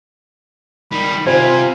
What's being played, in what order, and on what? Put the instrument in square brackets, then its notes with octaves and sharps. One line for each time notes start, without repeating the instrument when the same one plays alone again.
[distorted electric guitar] D#3 G3 [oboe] B5
[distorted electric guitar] C3 [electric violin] F4 [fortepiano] C5 [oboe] G#5